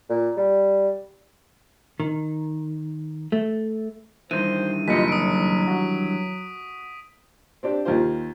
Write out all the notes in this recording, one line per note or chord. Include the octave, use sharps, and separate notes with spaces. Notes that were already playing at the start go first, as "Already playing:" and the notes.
A#2
G3
D#3
A3
G2 D#3 E3 C5 D#7
F#1 F4 G4 D#5 B6 C#7
F#3 D#6 D7
F#4
C4 D4 G4
D#2 F4 G4 C5